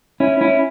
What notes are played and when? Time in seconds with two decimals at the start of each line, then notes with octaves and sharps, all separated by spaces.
0.20 C#4 E4
0.41 C#4 E4